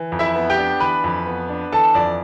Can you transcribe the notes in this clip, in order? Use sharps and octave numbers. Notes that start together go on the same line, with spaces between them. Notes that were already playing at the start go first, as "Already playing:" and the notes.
Already playing: E3
F2
E4 E5
B3
G4 G5
D4
E3 B4 B5
F2
B3
D4
E3 A4 A5
F2 D5